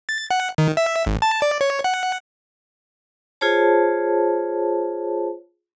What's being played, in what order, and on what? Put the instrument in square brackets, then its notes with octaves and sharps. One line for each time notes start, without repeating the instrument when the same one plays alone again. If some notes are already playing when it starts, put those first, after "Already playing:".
[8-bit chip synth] A6
F#5
D#3
E5
G#1
A5
D5
C#5
F#5
[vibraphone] F4 G#4 C5 C#5 A5